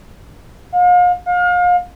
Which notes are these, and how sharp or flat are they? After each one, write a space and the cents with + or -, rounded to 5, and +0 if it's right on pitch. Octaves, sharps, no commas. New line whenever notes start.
F5 +40
F5 +35